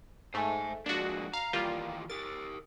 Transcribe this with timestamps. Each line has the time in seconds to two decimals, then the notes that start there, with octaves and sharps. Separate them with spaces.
0.34 G#2 A3 C5 G#5
0.86 F3 G#3 A#3 D4 F#4
1.33 F5 A#5
1.53 D#3 E3 G3 A#3 F4 G4
2.10 G4 A#4 A6